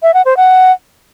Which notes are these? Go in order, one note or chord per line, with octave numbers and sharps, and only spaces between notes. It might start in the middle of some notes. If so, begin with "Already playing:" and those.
E5
F#5
C5
F#5